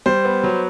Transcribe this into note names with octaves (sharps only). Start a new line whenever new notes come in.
G3 C5
B3
F#3